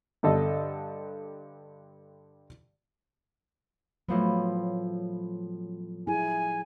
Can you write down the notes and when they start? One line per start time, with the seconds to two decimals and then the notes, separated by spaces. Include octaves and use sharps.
0.23 G2 D3 A4 D#5
4.09 A2 F3 F#3 B3
6.07 E4 G#4 G#5